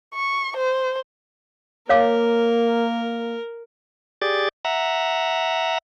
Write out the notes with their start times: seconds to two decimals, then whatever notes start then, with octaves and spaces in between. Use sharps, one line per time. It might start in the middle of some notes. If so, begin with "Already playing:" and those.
0.14 C#6
0.57 C5
1.89 A#3 A#4 C#5 F5 D6
4.22 G4 G#4 D5 A6
4.65 E5 F#5 A#5